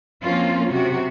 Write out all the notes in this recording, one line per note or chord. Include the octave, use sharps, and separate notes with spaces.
F3 A#3 C4 C#4 F4
C3 F#3 F#4